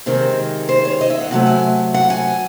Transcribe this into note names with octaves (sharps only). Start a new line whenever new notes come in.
C3 D#3 G#3 C4
C5
C#5
D#5
E5
F#5
C3 F#3 A3 F#5
G#5
F#5
G#5